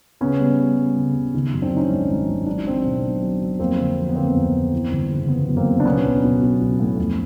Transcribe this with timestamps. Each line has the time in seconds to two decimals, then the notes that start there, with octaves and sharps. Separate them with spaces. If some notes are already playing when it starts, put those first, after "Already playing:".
0.21 C#3 B3 C#4
0.39 G3
0.59 G3
0.77 G3
0.96 C#3
1.15 C#3
1.34 D#3
1.53 F#2
1.62 C4 D4
1.72 D#3 C#4 D#4
1.90 G#1
2.09 G#1
2.28 G#1
2.47 F#3 D4
2.57 D#4
2.66 F#3 C4 D4
2.85 B2
3.03 F#3
3.22 F#3
3.41 F#3
3.59 F2 A#3 C4
3.79 D3
3.98 F3
4.09 B3
4.16 D3 A#3 C4
4.35 F2
4.54 F3
4.72 E3
4.91 G1
5.10 C#3
5.28 E3 B3
5.48 F#2
5.57 A#3 C4
5.66 C#3
5.80 D4
5.85 B1 B3 C#4
6.05 B1
6.23 B1
6.41 B1
6.60 B1
6.80 A2
6.98 F2